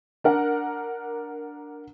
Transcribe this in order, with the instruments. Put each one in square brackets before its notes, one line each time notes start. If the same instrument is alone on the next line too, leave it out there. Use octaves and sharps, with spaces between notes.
[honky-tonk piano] D4 A#4 F#5